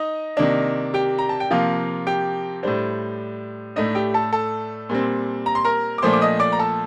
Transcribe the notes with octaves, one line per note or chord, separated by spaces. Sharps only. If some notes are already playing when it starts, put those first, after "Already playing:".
Already playing: D#4 D#5
C3 D#3 A#3 D4
G4 G5
A#5
A5
G5
C3 F3 A#3 F4 F5
G4 G5
A2 G3 D4 C5
A2 A3 D4 D#4 D#5
G4 G5
A4 A5
A4 A5
A#2 G3 C4
A#5
C6
A#4 A#5
D6
A#2 F3 A3 D4 C5 C6
D6
D#5 D#6
D5 D6
A#5
A4 A5